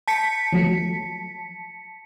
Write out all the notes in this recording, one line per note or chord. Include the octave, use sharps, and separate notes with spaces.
A5 B6 C#7
F3 F#3 A3